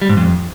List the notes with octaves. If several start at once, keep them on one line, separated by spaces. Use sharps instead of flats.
G3
G#2
F2